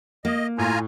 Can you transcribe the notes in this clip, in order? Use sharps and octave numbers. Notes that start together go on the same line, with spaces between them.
A#3 D#5
A2 F4 G#5 A#5